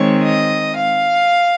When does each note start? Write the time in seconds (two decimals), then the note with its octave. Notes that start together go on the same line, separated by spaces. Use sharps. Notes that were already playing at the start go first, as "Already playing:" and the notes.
Already playing: D#3 G#3 C4 C#5
0.24 D#5
0.76 F5